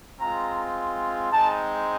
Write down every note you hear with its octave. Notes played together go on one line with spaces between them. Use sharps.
G#3 C4 F4 A#5
G#3 C4 D#4 A5